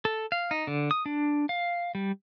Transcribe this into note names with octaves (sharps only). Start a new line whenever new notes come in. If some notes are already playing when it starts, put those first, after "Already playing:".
A4
F5
D#4
D3
D#6
D4
F5
G3